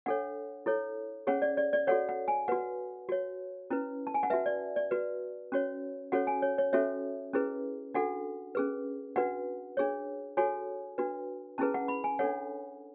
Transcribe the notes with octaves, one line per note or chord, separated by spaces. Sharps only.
D4 A4 C#5 F#5
E4 A4 C#5
C#4 G#4 C#5 F#5
D5
D5
D5
F#4 A4 C#5 F#5
F#5
G#5
F#4 B4 F#5
F#4 C#5
C#4 E4 B4
A5
G#5
F#5
F#4 B4 E5
D5
D5
F#4 B4
C#4 F#4 C#5
C#4 F#4 A4 C#5 F#5
G#5
C#5
C#5
C#4 F#4 A4 C#5 E5
C#4 E4 G#4 B4
D4 F#4 A4 F#5
C#4 G#4 B4
D4 F#4 B4 F#5
D4 G#4 C#5
F#4 A4 C#5 G#5
D4 F#4 B4
C#4 E4 G#4 B4 A5
F#5
B5
G#5
D4 A4 C#5 F#5